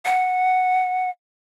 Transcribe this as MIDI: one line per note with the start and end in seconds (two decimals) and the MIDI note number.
0.05 1.10 78